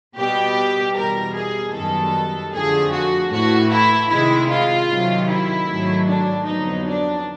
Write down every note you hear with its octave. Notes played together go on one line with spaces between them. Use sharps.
B2 G3 B3 G4
E2 B2 G3 A#4
G#4
F#2 D#3 G3 B3 A4
F2 D3 F3 A3 G#4
F#4
A2 E3 A3 F#4
E4
C3 D#3 G#3 E4
F4
C3 D#3 F#3
E4
G#2 D#3 F#3 A3
D4
F2 D3 F#3 B3 D#4
D4